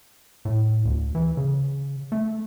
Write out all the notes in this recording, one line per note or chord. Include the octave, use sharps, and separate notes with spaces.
A2
D2
E3
C#3
A3